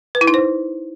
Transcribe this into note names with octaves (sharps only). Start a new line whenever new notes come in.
B4
E4
D#4
C5